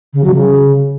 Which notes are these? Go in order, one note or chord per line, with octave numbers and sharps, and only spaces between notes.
C#3
F#3
C#3